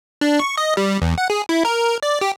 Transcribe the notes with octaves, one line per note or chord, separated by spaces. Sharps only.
D4
C#6
D#5
G3
E2
F#5
G#4
E4
A#4
D5
G4